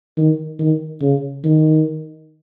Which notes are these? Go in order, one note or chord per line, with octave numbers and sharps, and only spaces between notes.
D#3
D#3
C#3
D#3